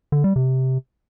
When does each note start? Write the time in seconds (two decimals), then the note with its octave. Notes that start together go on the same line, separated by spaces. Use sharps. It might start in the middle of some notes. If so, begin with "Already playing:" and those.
0.12 D3
0.24 G3
0.36 C3